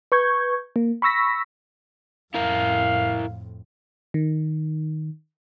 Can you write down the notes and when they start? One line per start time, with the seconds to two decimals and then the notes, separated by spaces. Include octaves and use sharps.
0.12 B4 C#6 G6 G#6
0.76 A#3
1.02 B5 C#6 E6 A#6 B6
2.34 F2 A2 E4 A#4 F5
4.14 D#3